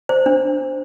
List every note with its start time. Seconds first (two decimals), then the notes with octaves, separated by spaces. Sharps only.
0.09 C5
0.26 D4